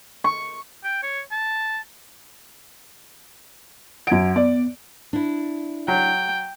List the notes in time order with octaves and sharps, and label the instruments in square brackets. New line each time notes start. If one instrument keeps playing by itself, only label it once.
[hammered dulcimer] C#6
[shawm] G5
C#5
A5
[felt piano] F#2 D7 [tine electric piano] F#5 G#6
[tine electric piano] B3 [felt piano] D5
[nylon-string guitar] D4 E4
[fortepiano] F#3 [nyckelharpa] G5